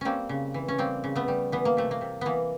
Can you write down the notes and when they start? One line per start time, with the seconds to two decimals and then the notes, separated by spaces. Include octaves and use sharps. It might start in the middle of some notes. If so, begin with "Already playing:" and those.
0.01 G3 A#3 C4 C#4
0.29 C#3
0.54 E3
0.68 C#4
0.78 G3 A#3 C4
1.04 C#3
1.15 A3 B3
1.28 G3
1.52 E3 B3
1.65 A#3
1.77 C3 A3
1.91 A#3
2.01 C3
2.21 E3 A#3 B3